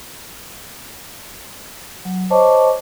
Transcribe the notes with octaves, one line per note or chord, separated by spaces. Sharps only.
F#3
C5 C#5 D#5 A5 C#6 D6